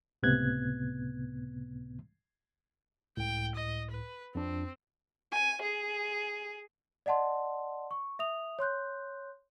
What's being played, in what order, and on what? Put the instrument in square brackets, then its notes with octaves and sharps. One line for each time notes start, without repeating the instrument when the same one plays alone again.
[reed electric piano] C#2 A2 C3 B3 F#6 G#6
[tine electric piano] C#2 A2 [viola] G5
[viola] D#5
B4
[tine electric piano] F2 D4 [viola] C4
[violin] G#5
G#4
[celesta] D5 D#5 F#5 A5 C6
C#6
E5 D#6 F7
C#5 C6 F#6 G6